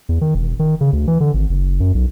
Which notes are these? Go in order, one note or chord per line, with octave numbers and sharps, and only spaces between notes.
E2
D#3
E1
D#3
C#3
D2
E3
D3
G#1
F#1
F#2
B1